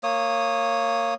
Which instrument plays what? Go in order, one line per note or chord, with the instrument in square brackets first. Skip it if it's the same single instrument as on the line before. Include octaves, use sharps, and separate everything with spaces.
[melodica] A#3 C#5 D#6